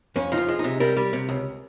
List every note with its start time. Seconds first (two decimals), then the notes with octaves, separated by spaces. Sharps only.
0.16 F2 C#4
0.32 F3 D#4
0.38 F4
0.49 G#3
0.59 C3 D#4
0.80 G3 A#4
0.97 G3
1.13 C3
1.29 C#2